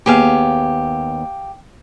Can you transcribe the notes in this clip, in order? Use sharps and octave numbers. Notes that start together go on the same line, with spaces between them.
D#2 B3 G4 G#4 F5